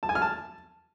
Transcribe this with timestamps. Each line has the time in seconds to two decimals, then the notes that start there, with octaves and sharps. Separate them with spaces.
0.03 A5
0.09 G#5
0.15 F6
0.22 A5